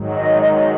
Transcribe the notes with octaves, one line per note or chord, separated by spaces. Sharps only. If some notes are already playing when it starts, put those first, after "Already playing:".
Already playing: G#2 D#3 F#3
D#5
D#5